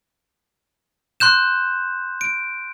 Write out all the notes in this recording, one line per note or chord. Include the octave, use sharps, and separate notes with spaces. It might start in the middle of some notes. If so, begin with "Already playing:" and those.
C6 F#6 G6 E7
D7